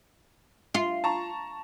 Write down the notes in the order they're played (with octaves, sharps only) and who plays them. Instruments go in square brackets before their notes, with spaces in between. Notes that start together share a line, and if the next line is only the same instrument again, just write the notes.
[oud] F4
[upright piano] A5 A#5 C#6